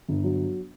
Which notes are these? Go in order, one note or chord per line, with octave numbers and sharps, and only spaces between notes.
G1
F#3